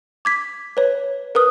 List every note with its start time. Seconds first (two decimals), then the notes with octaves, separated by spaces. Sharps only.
0.25 D6 G#6 B6
0.77 B4 C#5
1.35 A#4 B4 D#6